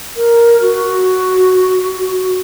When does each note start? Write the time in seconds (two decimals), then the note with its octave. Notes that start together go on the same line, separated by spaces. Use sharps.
0.16 A#4
0.61 F#4